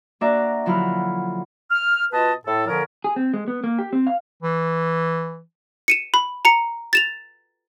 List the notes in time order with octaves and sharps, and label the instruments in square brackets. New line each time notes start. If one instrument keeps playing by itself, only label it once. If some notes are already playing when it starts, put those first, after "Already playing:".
[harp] A#3 D4 F#4 D5 E5 A#5
D3 F3 F#3 E4 B5 F6
[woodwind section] F6
B2 F4 B4 D#5 A5
A2 A4
A#2 D3 F3 C#4 A#4
[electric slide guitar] G#4
C4
G#3
B3
A#3
G4
C4
F5
[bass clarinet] E3
[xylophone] C#7 D#7 E7
B5
A#5 C#7
A6 E7 F7